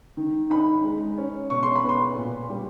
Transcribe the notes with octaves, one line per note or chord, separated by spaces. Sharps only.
D#3
D#4 B5
G#3
C#4
B2 C#6
C6
B5
B3 C6
A#2
G3